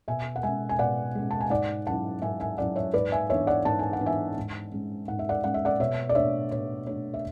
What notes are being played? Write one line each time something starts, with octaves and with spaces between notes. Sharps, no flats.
B2 E5 G#5
F#5
G#3 C#4 E5 G#5
G#5
B2 D5 F#5
G#3 C#4
A5
G#5
G#2 D5 F#5
F#3 C#4 E4 F#5 A5
G#2 E5 G#5
E5 G#5
F#3 C#4 E4 D5 F#5
C#5 E5
G#2 B4 D5
E5 G#5
E3 B3 D4 C#5 E5
D5 F#5
G#2 A5
G#5
F#5
E3 B3 D4
E5 G#5
G#2
G#3 C#4
G#2 F#5
E5
D5 F#5
G#3 C#4 F#5
E5
D5 F#5
B2 C#5 E5
D5
A3 D4 C#5 E5
B2 C#5
A3 D4 C#5
E5